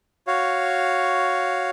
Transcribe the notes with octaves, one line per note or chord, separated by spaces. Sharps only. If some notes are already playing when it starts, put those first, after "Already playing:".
F#4 C#5 F5